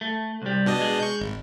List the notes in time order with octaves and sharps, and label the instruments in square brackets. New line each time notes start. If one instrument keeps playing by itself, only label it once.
[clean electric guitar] A3
C2 G3
[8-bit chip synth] B2 D4 D#5
[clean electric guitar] G#3
[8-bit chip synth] C#6 G6
G#1